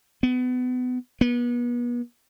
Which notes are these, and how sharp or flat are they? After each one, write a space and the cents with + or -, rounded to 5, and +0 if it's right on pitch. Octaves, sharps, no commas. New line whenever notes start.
B3 +25
B3 -35